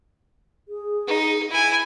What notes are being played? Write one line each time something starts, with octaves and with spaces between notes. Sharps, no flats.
G#4
D#4
E4 G#5